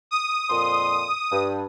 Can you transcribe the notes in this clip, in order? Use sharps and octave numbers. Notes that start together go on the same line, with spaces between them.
D#6
F2 A#2 C6
G2